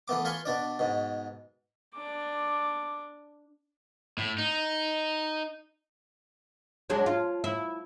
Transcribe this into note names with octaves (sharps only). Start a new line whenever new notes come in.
E3 A3 B3 D6
F4 B4 G#5 C6 C#6
B2 D4 D5
G#2 B2
D4 D6
A2
D#4
F#3 G#3 D4
F4
E4